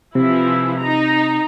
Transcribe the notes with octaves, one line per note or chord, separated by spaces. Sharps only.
C3 E3 F3 E4
D#4 A#5